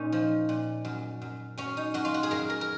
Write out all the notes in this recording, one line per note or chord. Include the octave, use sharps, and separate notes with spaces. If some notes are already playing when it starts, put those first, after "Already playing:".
Already playing: A#2 C#4 D#4
F3
A#2
F#2
F#2
F#2 C#4
D#4
F#2 F#4
F4
F#4
G#4
F#2 A#4
A#4
A#4